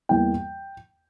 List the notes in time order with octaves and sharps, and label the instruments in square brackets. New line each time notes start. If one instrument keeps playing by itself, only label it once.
[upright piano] E2 E3 G3 A#3 G5